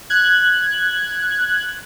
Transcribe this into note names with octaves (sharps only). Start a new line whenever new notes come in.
F#6 G#6